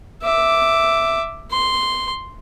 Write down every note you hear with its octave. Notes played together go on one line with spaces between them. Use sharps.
E5 D6
C6